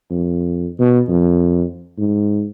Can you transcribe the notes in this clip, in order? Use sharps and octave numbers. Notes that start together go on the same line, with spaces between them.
F2
B2
F2
G#2